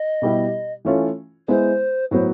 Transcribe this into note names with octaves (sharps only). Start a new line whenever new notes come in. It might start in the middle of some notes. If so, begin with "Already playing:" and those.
Already playing: D#5
B2 G3 B3 E4 G4
E3 A3 C#4 F4
G#3 B3 E4 C5
A2 F#3 B3 C5